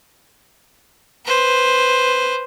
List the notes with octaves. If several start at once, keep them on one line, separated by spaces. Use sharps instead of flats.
B4 C5